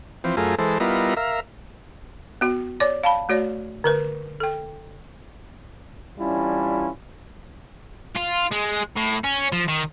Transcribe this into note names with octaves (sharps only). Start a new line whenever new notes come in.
E3 F3 C4
F#2 A3 F4 G#4 A#4
E3 G#3 A4 C5
G3 B3 E4 F4 A#4 D#5
A#4 E5 F5
B3 F#4
C#5 D5 D6
F5 A5 B5
A3 F#4 C#5 D5
D3 A#4 B4
A4 G5
E3 G3 C#4 D4 E4 F4
F4
G#3
A2
C#4
F3
D#3